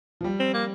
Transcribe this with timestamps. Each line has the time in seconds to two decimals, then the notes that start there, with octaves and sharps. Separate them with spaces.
0.21 F3
0.24 G3
0.40 C4
0.54 A#3